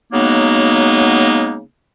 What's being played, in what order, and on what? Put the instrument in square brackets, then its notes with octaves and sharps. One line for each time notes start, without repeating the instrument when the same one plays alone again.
[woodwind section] C#3 F#3 G#3 A#3 B3 D#4